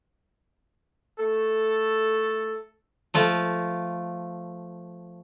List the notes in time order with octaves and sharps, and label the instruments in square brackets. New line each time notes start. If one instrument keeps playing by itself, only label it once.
[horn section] A3 A4
[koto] F3 A3 F4